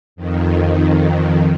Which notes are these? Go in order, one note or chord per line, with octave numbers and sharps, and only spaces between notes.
F2 D#3